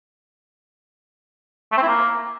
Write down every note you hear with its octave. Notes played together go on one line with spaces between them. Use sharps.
A3
C4
E4
A#3